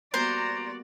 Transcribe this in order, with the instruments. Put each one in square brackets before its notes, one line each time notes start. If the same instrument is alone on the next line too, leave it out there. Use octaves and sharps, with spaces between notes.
[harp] G3 A#3 B3 [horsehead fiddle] F#4 D5 [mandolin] C5 [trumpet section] A#5